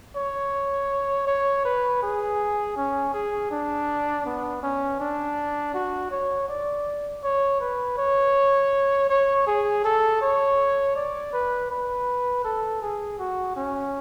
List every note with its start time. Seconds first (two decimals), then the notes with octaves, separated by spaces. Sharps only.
0.16 C#5
1.27 C#5
1.65 B4
2.03 G#4
2.77 C#4
3.14 G#4
3.51 D4
4.26 B3
4.63 C#4
5.00 D4
5.74 F#4
6.11 C#5
6.49 D5
7.24 C#5
7.60 B4
7.98 C#5
9.09 C#5
9.47 G#4
9.84 A4
10.22 C#5
10.96 D5
11.33 B4
11.71 B4
12.45 A4
12.82 G#4
13.19 F#4
13.56 C#4